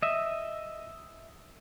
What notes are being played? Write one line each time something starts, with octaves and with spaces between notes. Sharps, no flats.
D#5 E5